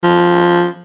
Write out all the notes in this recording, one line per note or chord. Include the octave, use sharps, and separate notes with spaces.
F3